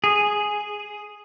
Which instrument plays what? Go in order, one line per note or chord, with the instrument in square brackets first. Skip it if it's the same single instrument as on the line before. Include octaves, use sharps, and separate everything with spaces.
[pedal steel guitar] G#4